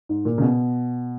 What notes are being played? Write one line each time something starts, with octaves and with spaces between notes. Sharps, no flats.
G#2
A#2
C#3
B2